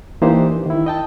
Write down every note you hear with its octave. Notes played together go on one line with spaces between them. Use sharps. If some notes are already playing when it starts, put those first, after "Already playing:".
E3 A#3 D4 D#4 G4 C5
D#3 E4
D#5 G5 A5